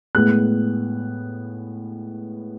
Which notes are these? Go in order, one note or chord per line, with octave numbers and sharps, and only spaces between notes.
A2 G#3 B3 F#6